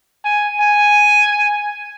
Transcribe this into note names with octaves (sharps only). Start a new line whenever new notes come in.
G#5
G#5